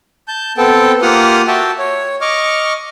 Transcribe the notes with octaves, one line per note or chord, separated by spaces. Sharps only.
A5 G6
B3 C4 A4 G5 A5
A#3 F4 G4 F#5 D#6 F6
F#4 E5 G5 A5
C#5
D#5 C#6 D6 F6